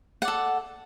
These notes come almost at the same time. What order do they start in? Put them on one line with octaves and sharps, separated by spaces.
F#5 D5 A4